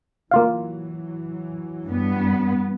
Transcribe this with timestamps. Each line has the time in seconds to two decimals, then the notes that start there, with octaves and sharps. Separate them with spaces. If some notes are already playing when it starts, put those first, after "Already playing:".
0.31 E3 F#3 A#3 F4 F5
1.87 G2 B3